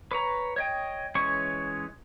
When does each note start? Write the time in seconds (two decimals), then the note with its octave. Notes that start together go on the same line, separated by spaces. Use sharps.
0.11 B4 C#5 A#5
0.56 C#5 D#5 G5
1.15 E3 G#3 C#4 C#5 C#6